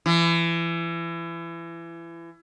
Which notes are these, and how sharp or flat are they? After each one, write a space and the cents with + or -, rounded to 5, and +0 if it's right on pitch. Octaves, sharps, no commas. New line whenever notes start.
E3 +30